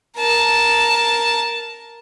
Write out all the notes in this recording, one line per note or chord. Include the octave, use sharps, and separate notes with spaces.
A#4 A5